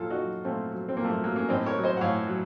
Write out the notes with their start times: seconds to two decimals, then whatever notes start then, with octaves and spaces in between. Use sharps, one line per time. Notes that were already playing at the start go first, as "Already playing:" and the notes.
Already playing: A#2 F#3 F4 A4
0.10 D#4 F#4
0.20 F#3
0.45 A#2 A3 C4
0.71 F#3
0.89 C4
0.97 A#2 A#3
1.04 A3
1.10 A#3
1.24 F#3 A#3
1.36 A#3 C#4
1.49 A2 C4 D#4
1.66 A#4 C#5
1.76 F#3
1.83 C5 D#5
1.97 F#5
2.01 A2 C#5 F5
2.27 F#3